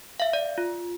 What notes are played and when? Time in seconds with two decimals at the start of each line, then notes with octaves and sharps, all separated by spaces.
0.20 E5 F5
0.33 D5
0.58 F4